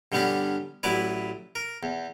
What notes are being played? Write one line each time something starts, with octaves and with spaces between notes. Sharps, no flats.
G2 D3 G3 B3 C#4 D4
A1 F#3 E4 B4 D5
A#4
E2